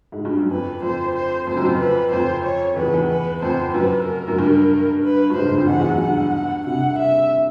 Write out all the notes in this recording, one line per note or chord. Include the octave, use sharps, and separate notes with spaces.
G#2
G2
F#2
F2 B4
F2 C5
C5
F2 C5
F#2
F2
B4
F2 C5
C#5
E2 B4
E2
B4
F2 C5
F#2 B4
A#4
F#2
G2
B4
G2
G#2 C5
G2
F2
E2 F#5
E2
F#2
G2 F#5
F#5
C3 F#5
E5